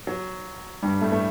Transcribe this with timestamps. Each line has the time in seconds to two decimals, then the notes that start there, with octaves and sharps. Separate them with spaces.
0.07 F#3
0.82 G2 G3
1.01 A2 A3
1.12 A3